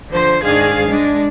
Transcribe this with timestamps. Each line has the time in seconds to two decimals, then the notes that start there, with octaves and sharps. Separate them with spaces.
0.11 D3 F3 C5
0.43 G#2 D#3 D4 G#4 F5
0.88 G#3 D4